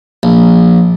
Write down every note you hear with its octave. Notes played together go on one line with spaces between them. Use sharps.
A#1